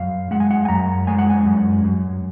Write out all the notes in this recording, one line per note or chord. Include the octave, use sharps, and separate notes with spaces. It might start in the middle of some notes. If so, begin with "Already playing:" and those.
Already playing: F#2 F5
G#3 F#5
G#5
F#5
G#5
F#2 A#5
G#3 G#5
F#5
G#5
F#2
F#2